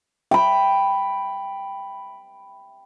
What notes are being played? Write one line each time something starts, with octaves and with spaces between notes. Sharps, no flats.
G5 B5